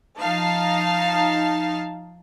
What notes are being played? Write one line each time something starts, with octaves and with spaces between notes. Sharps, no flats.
F3 D#4 F5 A5